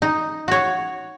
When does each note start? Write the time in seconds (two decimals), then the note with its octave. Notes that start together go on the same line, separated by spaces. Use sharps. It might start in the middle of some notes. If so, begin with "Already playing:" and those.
0.02 D#4
0.48 F#4 C#5